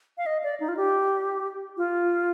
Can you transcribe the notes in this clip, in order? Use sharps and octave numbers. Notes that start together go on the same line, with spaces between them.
F5
D#5
D5
D#4
F4
G4
F4